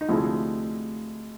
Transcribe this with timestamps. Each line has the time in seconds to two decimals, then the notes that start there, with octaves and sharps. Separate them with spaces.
0.01 D#4
0.09 D2 C3 F3 G#3 E4